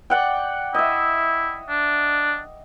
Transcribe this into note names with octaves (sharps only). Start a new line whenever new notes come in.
D5 F#5 G5
E4 D#5 E5
D4